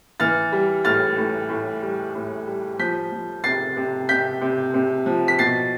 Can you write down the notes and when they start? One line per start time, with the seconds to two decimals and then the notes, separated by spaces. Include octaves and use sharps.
0.20 E3 F6 A6
0.52 G3
0.85 A2 F6 A6
1.17 A2
1.49 A2
1.82 G3
2.15 A2
2.47 G3
2.79 F3 G6 B6
3.12 F3
3.44 C3 A6 C7
3.77 C3
4.09 C3 G6 B6
4.42 C3
4.74 C3
5.06 F3
5.28 B6
5.39 B2 A6 C7